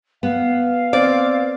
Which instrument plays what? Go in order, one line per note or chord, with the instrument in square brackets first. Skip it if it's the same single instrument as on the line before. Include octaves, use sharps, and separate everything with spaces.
[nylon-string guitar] B3 [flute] F5
[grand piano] C4 [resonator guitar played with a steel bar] D5